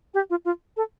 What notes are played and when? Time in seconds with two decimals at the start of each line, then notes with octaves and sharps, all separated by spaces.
0.14 G4
0.30 F4
0.45 F4
0.77 A4